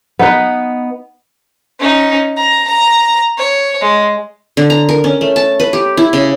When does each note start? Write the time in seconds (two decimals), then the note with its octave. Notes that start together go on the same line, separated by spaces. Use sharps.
0.19 B3 D#4 B4
1.79 C#4 D#4
2.36 A#5
2.68 A#5
3.37 C#5
3.81 G#3
4.57 D3
4.70 A#5
4.89 A#4
5.04 C#4
5.21 A3
5.36 A5
5.60 B4
5.73 G4
5.97 E4
6.13 C#3